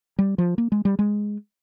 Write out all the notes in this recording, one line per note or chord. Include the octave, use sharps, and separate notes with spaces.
G3
F3
A#3
G#3
G3
G#3